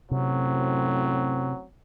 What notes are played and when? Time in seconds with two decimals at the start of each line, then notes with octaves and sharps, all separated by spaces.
0.11 F#2 A2 C3 F#3 C4